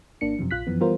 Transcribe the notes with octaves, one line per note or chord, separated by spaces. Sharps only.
G#1 A#3 D4 C#7
F#2 C3 F3
A#1 F4 F#6 B6
F#2 E3 F3 B3
E3 G3 B3 F4 A#4 C5